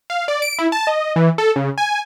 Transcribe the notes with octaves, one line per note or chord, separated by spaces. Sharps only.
F5
D5
D7
E4
A5
D#5
E3
A4
C#3
G#5